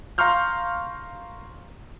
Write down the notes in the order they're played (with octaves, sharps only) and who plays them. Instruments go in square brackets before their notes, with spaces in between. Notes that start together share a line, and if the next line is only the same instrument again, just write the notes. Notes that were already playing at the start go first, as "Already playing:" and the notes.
[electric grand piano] F5 A#5 C6 C#6 F6 G6